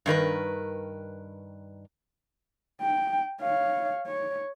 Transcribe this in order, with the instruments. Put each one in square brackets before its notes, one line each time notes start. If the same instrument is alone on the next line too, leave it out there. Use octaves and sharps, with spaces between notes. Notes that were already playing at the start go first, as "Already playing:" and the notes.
[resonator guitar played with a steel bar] G2 D#3 A#4 B4
[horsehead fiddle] G5
C#5 F5
C#5